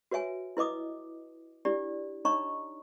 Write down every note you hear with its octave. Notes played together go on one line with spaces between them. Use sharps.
F#4 B4 C#5 E5 G#5
E4 B4 D#5 D6 D#6
D4 E4 G4 D5
D4 D#4 C#5 D#5 A#5 C#6